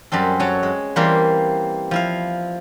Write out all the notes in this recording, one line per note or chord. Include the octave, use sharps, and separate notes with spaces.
F#2 G3 C4 A4
F#3 A4 C#5
G#3
E3 G3 A#3 C4 A#4
F3 E4 F5